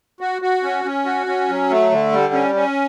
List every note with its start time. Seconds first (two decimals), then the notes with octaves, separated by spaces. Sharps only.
0.20 F#4
0.42 F#4
0.63 C#4
0.84 C#4
1.05 F#4
1.27 C#4
1.49 F#3
1.70 A3
1.91 D3
2.12 G3
2.33 C#4
2.55 C#4